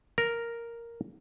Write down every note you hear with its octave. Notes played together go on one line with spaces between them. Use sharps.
A#4